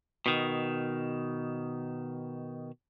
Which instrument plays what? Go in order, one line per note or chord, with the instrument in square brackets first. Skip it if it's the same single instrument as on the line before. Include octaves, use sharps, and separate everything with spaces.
[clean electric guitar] B2 D#3